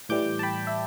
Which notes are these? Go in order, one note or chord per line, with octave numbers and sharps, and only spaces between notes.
A2 E3 G3 D6 G6
A5
G5 B5
E5